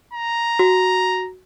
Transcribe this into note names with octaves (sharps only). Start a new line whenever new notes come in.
A#5
F#4